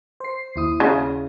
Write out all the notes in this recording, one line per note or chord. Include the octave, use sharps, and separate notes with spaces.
C5 C7
D#2 E4 D#6
C#3